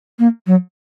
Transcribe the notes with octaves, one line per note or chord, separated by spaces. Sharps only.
A#3
F#3